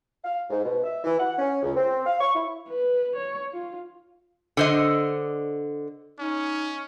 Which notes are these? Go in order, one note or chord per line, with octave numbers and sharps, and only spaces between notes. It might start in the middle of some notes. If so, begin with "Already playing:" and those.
F5
G#2
B2
E5
E3
F#5
C#4
C#2
C4
F5
C#6
E4
B4
C#5
F4
D3 C5 D#5
C#4 D#4